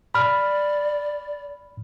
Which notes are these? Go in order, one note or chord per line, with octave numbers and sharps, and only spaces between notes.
D5 B5 F6